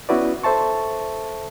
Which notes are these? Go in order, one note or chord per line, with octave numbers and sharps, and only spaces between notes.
B3 C#4 E4 F#4 B4 D5
A4 C5 E5 A5 C#6